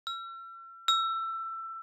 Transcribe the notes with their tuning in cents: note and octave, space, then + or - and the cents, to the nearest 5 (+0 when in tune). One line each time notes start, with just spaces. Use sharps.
E6 +45
E6 +20